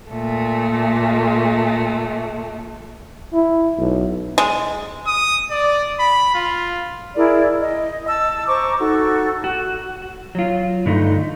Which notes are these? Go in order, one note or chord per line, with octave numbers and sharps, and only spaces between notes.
A#2 A3
E4
B1
G#3
D#6
D5
B5
F4
E4 G#4 A#4 D5
D#5
A5 E6
C5 A#5 C#6 D6
D#4 F#4 A4 C#6
F#4
F#3 F4
G2 D3 A3 D#4